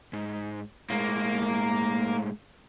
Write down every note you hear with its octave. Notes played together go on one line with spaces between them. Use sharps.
G#2
A2 G#3 A#3